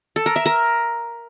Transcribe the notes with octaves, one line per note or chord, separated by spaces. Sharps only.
A4
A#4
E5
A#4